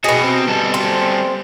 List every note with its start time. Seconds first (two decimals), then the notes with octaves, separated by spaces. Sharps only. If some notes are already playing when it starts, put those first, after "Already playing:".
0.04 B2 F#4 G#4 D#5
0.23 C3 C4
0.48 G3 A4
0.74 C4